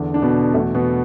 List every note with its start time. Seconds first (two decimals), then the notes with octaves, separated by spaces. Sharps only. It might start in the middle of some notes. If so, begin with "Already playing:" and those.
Already playing: E2 D3
0.14 D4
0.22 B2 B3
0.54 E2 B2 A3
0.75 B2 B3